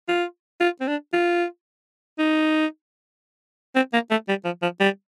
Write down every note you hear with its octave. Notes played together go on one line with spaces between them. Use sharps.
F4
F4
C4
D4
F4
D#4
C4
A#3
A3
G3
F3
F3
G3